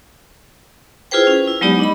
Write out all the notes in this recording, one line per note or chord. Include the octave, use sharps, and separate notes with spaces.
E4 F4 G#4 B4 C5 G5
C#4
E4
F#3 G#3 B3 D#4 G4 D5
D4 D#5 B5